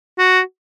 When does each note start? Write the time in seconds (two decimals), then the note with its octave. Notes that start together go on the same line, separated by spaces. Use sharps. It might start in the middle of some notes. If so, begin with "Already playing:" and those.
0.19 F#4